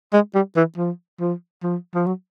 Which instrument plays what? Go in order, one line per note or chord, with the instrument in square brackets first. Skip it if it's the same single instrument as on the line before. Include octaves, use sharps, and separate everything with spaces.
[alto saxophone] G#3
G3
E3
F3
F3
F3
F3
F#3